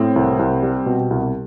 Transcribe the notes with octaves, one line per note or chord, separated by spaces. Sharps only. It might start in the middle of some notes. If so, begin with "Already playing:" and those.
Already playing: A2 C4
C2
C2
G3
B2
C2